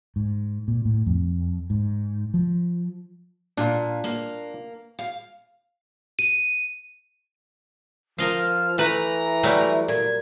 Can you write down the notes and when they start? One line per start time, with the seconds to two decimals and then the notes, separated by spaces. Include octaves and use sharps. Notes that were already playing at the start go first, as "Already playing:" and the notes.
0.16 G#2
0.68 A#2
0.85 A2
1.06 F2
1.70 G#2
2.34 F3
3.57 A#2 D4 F4
4.04 A#3
4.99 F5
6.19 D#7
8.18 F3 A#4 D#5 F5
8.38 F6
8.78 E3 A3 B4 A#5
9.43 F#3 G3 A3
9.88 A#2 G#6